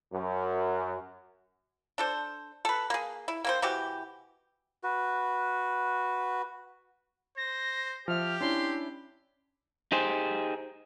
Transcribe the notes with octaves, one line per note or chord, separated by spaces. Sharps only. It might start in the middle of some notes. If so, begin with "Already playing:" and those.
F#2
D4 A4 C5
A4 B4
A#3 G#4
E4
A#3 C4 C5
C3 E3 F#4 G4
F#4 B4
C5 A#6
F3 G4 E5 F6
C#4 D4 E4 C6
D#4 G4 G#4 C5